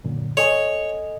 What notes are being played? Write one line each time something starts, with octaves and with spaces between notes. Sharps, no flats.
F#2 A#2 D3
A4 C#5 D#5 G#5